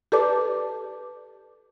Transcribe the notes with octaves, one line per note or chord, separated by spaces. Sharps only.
G4 A4 B4 D5 A5 D6